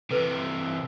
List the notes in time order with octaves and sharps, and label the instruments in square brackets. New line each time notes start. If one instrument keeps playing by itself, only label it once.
[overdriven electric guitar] C3 E3 [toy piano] A4 B4 D#6